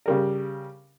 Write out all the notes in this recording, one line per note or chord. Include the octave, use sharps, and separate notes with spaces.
C#3 G3 A#4